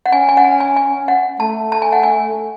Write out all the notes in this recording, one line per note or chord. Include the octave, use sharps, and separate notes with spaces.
F#5
C#4 G#5
G#5
F#5
G#5
G#5
G#5
F#5
A3 A5
A5
G#5
F#5
G#5